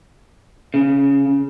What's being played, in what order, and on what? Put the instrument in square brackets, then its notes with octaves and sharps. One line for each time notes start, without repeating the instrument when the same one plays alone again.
[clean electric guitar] C#3